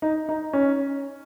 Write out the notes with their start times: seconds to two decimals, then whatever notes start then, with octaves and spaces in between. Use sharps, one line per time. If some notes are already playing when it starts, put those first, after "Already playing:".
0.02 D#4
0.29 D#4
0.53 C#4